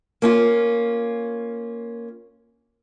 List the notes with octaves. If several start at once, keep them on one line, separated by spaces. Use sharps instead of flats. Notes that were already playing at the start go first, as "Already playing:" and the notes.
A#3 C#4 F4